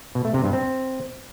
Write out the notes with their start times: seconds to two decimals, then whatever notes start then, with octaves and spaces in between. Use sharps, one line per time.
0.15 B2
0.25 A3
0.34 C3
0.44 G2
0.53 C4